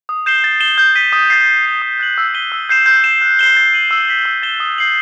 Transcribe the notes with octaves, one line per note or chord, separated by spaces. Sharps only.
D#6
G6 C7 E7 G7
A6
E7 G7
G6
B6 D#7 G7
D#6
A6 C7
A6
C7 E7 G7
D#6
F#6 A6 C7 F#7
E6
B6 D#7 G7
E6
G6 C7 E7
G6
C7 E7
F#6
C7 E7 G7
A6
D#7 F#7
E6
B6 F#7
E6
A6 E7 G7
D#6
G6 C7 F#7